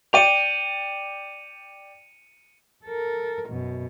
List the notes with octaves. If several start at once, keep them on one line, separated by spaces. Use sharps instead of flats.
D5 G5 C#7 D#7 F7
A4 A#4
F#2 B2